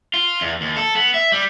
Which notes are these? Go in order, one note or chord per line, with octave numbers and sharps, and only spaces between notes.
F4
E2
D#2
A4
B3
E5
G3